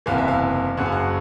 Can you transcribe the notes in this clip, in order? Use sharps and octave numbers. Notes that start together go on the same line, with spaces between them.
F#1 E2 C3 E3 F5
E5
F5
F#1 F#2 C#3 F#5
F5
F#5